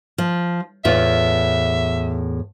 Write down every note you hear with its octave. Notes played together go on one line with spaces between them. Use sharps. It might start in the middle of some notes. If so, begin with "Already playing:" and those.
F3
E2 A2 F4 E5